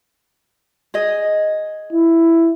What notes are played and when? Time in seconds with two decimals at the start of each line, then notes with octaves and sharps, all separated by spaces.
0.94 G#4 D#5
1.93 E4